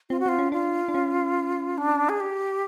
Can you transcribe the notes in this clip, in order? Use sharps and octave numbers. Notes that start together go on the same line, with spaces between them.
C4 F4
F#4
C4 F4
C#4
D4 F4
D4
C#4
D4
G#4
G4